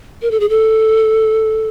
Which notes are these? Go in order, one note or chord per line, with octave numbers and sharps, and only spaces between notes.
A#4
A4
G#4
A4